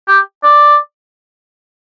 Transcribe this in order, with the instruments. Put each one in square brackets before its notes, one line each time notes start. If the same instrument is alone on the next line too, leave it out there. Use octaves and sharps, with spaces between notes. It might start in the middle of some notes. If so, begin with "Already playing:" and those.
[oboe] G4
D5